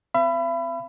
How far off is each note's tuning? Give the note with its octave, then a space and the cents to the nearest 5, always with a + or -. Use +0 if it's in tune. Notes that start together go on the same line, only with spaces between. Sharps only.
C4 -30 E5 +45 B5 +15